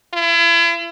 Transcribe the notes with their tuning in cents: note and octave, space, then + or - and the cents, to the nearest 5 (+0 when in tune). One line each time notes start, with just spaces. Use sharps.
E4 +40